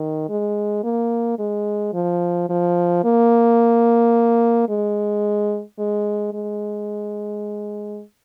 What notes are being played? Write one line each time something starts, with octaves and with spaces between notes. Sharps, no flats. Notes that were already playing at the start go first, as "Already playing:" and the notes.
Already playing: D#3
G#3
A#3
G#3
F3
F3
A#3
G#3
G#3
G#3